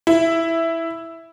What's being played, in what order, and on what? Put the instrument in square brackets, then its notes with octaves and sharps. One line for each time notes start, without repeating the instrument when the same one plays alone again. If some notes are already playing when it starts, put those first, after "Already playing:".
[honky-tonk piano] E4